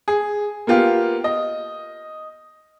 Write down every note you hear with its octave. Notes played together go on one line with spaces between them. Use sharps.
G#4
A#3 B3 F4 G4
D#5